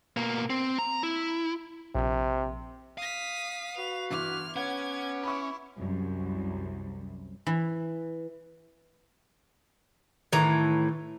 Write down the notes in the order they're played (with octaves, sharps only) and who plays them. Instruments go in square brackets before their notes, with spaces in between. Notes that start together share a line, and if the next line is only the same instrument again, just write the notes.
[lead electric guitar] B2 A#3
C4
A#5
E4
[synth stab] A#1 [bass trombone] C3
[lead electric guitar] F5 [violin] D#6 B6
[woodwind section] F#4 B4 [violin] F7
[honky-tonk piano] G1 E3 D6 [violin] F6
[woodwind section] B3 C#5 D6 [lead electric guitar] C#4 [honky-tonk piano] F#5 [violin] G#6
[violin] E4 [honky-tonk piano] B5 C#6
[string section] C2 F#2
[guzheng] E3
[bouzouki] A2 E3 A#5 [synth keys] D#3